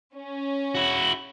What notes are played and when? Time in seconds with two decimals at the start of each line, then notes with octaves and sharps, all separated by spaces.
0.16 C#4
0.75 E4 F#4